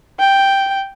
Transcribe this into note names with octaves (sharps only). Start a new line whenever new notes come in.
G5